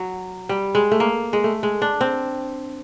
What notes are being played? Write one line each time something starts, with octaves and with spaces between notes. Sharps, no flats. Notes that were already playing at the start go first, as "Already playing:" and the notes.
Already playing: F#3
G3
G#3
A3
A#3
G#3
A3
G#3
D4
C4